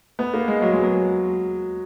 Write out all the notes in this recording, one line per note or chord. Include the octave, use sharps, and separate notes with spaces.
B3
A#3
G#3
F#3
G#3
F#3